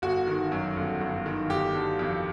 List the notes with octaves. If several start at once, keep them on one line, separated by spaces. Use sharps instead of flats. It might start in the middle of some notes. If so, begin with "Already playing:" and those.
G1 F#4
D#3
F#2
G1
G1
D#3
G1 G4
D3
F2